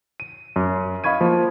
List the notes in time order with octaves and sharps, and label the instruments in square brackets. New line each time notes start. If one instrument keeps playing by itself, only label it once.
[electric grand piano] D#7
F#2
D#5 F5 B5 C#6 G#6 D#7
F3 A#3